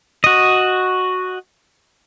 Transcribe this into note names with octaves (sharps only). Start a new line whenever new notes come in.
F#4 D#5